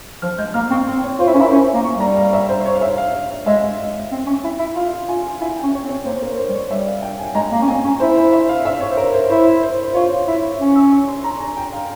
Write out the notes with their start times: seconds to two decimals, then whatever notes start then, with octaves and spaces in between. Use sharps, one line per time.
0.22 F3 F6
0.38 G#3 G6
0.54 A#3 F6
0.70 C4 C#6
0.87 C4 C6
1.03 C#5
1.19 F4 C5
1.27 E4
1.34 C#4 A#4
1.41 E4
1.51 C#4 C5
1.68 E5
1.74 A#3
1.84 C#6
1.96 G3 A#5
2.17 F5
2.33 E5
2.49 C5
2.60 C5
2.65 C#5
2.74 F5
2.81 E5
2.97 F5
3.30 F5
3.46 G#3 E5
4.12 C4
4.27 C#4
4.44 E4
4.59 E4
4.75 F4 F5
5.08 F4 G#5
5.41 E4 G#5
5.57 G5
5.63 C#4
5.74 C#5
5.84 C4
5.89 C#5
6.05 A#3 C5
6.22 A#4
6.37 C5
6.49 G3
6.55 C#5
6.71 G3 E5
6.87 F5
7.02 G5
7.19 G#5
7.35 G#3 A#5
7.52 A#3
7.62 C#4
7.67 C4 G#5
7.84 C#4
8.00 E4 C5
8.16 C5
8.33 E5
8.49 F5
8.65 E5
8.80 C#5
8.91 C5
8.97 A#4
9.14 C5
9.30 E4 C5
9.63 C5
9.83 C5
9.94 F4 C#5
10.27 E4
10.59 C#4
10.75 E6
10.92 C#6
11.08 C6
11.24 A#5
11.40 G#5
11.57 G5
11.73 F5